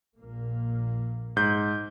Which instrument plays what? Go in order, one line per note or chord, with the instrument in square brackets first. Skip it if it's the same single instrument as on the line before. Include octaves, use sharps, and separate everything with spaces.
[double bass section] A#1 A#2 A#3
[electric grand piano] G#2 G6